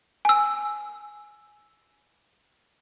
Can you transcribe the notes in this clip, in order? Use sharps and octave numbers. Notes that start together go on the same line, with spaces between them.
G#5 E6